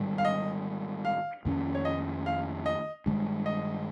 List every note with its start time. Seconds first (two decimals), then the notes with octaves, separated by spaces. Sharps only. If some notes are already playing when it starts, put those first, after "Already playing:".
Already playing: G#2 D#3 G3
0.18 F5
0.25 D#5
1.05 F5
1.45 F2 D#3 A#3 C#4
1.75 C#5
1.85 D#5
2.26 F5
2.66 D#5
3.06 G2 D#3 G#3
3.46 D#5